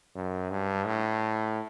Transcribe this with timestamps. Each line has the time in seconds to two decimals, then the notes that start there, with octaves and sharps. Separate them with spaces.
0.16 F#2
0.51 G2
0.86 A2